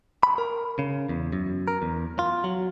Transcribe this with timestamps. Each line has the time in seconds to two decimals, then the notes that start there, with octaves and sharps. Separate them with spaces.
0.23 B5
0.38 A#4
0.79 C#3
1.09 E2
1.32 F#2
1.68 A#4
1.82 E2
2.19 F4
2.44 F#3